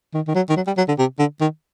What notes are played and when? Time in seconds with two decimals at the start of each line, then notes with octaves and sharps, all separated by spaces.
0.14 D#3
0.28 D#3
0.35 F#3
0.49 D#3
0.57 F#3
0.67 G3
0.77 F#3
0.88 D3
0.99 C3
1.19 D3
1.41 D#3